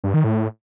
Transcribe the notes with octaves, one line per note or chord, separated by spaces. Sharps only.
G2
D#3
A2